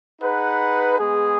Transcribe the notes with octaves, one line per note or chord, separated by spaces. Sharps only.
D#4 G#4 B4 F#5
G#3 B3 G#4